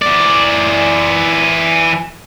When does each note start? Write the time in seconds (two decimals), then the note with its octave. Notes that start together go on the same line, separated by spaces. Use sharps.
0.02 E3 D5